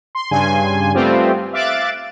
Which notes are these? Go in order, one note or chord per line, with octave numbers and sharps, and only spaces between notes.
C6
G2 C#3 G#5 C6
G3 A3 B3 C4 F4 G4
E5 F5 D6 F#6 A6 D7